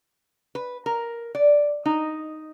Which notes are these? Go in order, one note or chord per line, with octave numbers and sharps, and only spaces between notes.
B4
A#4
D5
D#4